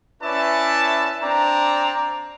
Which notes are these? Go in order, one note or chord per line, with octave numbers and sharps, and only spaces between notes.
C#4 E4 B4 D5 E5 A5
C4 D4 D5 A#5